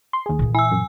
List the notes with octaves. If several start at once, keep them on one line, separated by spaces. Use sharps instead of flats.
C6
D#2 G#4
A#2 E3
E4 G#5 E6
F#2